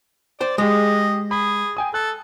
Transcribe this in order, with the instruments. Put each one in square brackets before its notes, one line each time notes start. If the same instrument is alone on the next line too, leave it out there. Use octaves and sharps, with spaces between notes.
[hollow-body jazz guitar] C5 G5 [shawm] D5
[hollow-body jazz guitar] G#3 [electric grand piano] G4 G#4 [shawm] D#5
[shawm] G#4 [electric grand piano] B5
[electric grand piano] G5 G#5 D#6
[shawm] A4 [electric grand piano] F#6